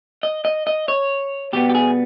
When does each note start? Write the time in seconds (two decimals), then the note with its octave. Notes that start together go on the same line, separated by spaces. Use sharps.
0.23 D#5
0.45 D#5
0.67 D#5
0.88 C#5
1.53 B2 G3 B3 G4
1.70 G4
1.75 G#4